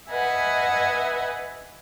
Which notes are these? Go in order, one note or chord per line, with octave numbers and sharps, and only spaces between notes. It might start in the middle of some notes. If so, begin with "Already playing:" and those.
B4 D#5 E5 F#5 G#5